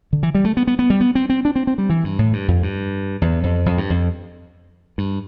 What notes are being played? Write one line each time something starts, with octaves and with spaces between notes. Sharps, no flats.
D3
E3
G3
A3
B3
B3
B3
G3
B3
C4
C4
D4
C4
C4
G3
E3
G2
A2
G2
F2
G2
E2
F2
F2
G2
F2
G2